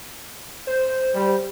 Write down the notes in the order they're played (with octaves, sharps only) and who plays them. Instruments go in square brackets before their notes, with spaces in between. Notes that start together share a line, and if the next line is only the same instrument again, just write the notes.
[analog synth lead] C5
[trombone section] G3